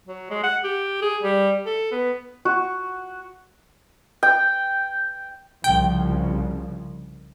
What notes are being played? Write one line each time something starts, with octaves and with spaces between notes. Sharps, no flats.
F#3
G#3
F#5
G4
G#4
G3
A4
B3
F#4
G5
C2 C#3 F3 G5